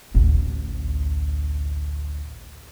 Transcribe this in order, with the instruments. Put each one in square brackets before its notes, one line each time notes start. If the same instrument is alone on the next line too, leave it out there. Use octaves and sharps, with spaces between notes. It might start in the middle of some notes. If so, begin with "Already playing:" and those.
[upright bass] A1 D2